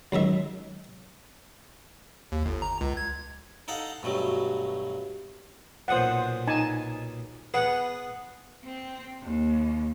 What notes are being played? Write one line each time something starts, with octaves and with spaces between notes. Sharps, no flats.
C#2 F#2 D#3 E5
D#2
G1
A#5
C#2
G#6
D#4 A4 F5 F#5
G2 B2 F#3 A3
B1 A#2 C5 F#5 D#6
D#4 G#5 A5
B3 G#4 B4 F#5
C4
D#2